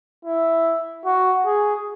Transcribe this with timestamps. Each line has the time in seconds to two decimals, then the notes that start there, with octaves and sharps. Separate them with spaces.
0.25 E4
1.06 F#4
1.46 G#4